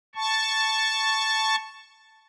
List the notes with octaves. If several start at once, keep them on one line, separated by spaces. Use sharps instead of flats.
A5 C#6